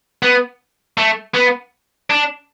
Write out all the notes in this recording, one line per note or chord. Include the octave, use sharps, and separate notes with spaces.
B3
A3
B3
D4